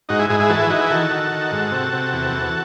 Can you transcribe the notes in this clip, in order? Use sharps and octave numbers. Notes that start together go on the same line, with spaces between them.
G#2 D#4 F#4
E4 G#4
G#2 E4 G#4
E4 G#4
E3 F#4 A4
E4 G#4
E3 D#4 F#4
E4 G#4
D#3 F#4 A4
D#3
D#3
G#2
C3
C3
E2
E2